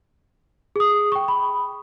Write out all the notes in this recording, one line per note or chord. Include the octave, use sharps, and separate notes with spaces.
G#4 D#6
G5 C#6
B5